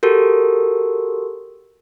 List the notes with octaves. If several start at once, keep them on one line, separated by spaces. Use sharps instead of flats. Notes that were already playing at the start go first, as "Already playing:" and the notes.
F#4 G4 A4 A#4